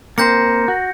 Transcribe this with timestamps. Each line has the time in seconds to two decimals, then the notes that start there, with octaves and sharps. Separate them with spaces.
0.18 A#3 C4 A#4 C5 G6 A#6 C#7
0.68 F#4